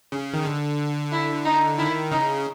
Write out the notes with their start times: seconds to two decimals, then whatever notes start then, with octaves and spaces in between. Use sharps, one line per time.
0.12 C#3
0.33 D#3
0.45 D3
1.12 E4
1.45 D#4
1.78 D#3 E4
2.11 C#3 D#4